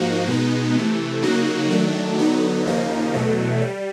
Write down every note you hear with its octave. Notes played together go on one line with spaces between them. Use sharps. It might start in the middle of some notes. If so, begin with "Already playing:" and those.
Already playing: G#2 F3 A#3 D#4 F#4
B2 G#3 B3 D#4
C3 E3 A3
C#3 F#3 A#3 D#4 F#4
D#3 F#3 A3 D4
D3 F#3 B3 D#4
D#2 C#3 F3 A#3 D#4
E2 B2 F#3 A3
G3